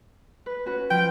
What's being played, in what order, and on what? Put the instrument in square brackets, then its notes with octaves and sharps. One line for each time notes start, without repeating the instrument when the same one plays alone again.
[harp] B4
C#4 F#4 B4
[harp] F3 [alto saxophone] G5